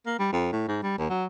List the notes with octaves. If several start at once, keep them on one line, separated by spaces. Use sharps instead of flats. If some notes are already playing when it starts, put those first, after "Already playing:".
A#3
G3
F2
A2
G#2
G3
D#2
F#3